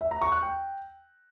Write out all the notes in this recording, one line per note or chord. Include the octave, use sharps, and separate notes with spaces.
E5
A#5
C#6
F#6
G5